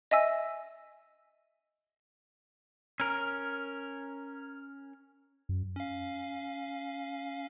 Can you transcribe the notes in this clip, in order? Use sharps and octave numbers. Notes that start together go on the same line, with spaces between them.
D#5 E5 G#5 E6
C#4 A#4
F#2
C#4 F5